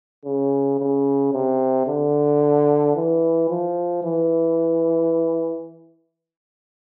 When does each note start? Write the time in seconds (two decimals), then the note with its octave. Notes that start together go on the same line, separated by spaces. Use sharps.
0.25 C#3
0.80 C#3
1.33 C3
1.87 D3
2.96 E3
3.49 F3
4.03 E3